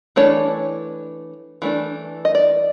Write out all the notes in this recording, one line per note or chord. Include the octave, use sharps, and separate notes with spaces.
E3 A3 D4 C#5
E3 A3 D4
D#5
D5